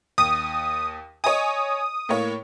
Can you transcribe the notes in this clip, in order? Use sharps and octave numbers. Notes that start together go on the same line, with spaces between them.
D#2 D#6
C#5 D#5 G#5 D#6
A2 A#3 C#5